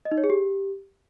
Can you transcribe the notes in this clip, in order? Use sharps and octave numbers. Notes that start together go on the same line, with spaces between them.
D#5
D#4
C#5
G#4
G4